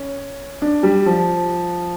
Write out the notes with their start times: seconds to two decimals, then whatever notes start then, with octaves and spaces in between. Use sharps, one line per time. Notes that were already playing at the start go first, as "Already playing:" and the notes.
Already playing: C#4
0.62 D4
0.83 G3
1.06 F3